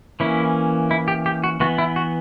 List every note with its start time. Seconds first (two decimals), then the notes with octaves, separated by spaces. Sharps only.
0.20 E3 A#3 C#4 E4
0.91 E4
1.08 G4
1.26 G4
1.44 F#4
1.60 E3 B3 F#4
1.78 E4
1.96 F#4